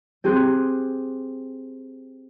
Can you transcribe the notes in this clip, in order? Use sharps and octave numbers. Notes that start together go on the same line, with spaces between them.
C4 G4 G#4 C6 F#6